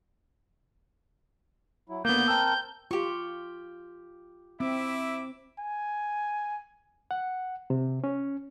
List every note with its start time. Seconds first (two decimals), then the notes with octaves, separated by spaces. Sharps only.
1.89 F#3 E4
2.05 D#2 D3 A#3 B3 G6
2.28 C4 A#4 G5 A5 E6
2.91 F4 G4 C#6
4.60 C4 E4 E5 D6
5.59 G#5
7.11 F#5
7.70 C3
8.04 C#4